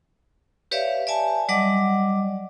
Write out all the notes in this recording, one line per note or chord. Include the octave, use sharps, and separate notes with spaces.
G4 B4 C#5 D5 E5 F5
D5 E5 G#5 A5
F#3 G3 D5 D#5 F#5 D6